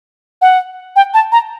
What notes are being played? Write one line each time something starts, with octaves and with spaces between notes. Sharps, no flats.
F#5
G5
A5
A#5